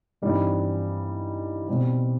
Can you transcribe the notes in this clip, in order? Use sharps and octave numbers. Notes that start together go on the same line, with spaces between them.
G2 E3 G3 C4 D#4
B2 G3 C4